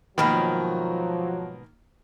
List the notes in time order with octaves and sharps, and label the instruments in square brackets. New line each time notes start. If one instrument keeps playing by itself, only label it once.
[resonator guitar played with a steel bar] G#2 B2 B4 [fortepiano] D#3 A#3 [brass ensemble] F3 F#3